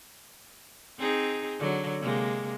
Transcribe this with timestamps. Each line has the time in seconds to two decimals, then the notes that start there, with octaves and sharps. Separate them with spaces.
0.99 C4 D#4 G#4
1.59 D3 F#3
2.00 C3 G#3 A#3